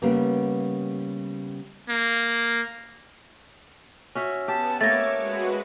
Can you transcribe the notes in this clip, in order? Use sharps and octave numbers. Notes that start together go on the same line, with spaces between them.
C#3 G3 A#3 B3
A#3
C#4 F#4 E5
B3 G4 A5
A3 A#3 C#5 C#6 D6 E6 A6 A#6
G#3 F#4 B4